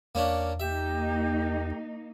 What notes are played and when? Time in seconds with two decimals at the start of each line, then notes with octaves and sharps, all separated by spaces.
0.15 E2 A#3 C#4 D4
0.60 A#3 D#4 G4 E5